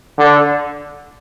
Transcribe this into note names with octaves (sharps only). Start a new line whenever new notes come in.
D3